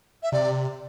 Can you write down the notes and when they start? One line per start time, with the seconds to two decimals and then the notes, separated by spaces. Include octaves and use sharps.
0.23 E5
0.32 C3 D5